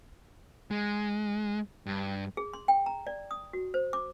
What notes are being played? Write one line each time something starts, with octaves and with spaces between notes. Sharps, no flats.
G#3
G2
G#4
C6
G5
A#5
D5
D#6
F#4
C5
D6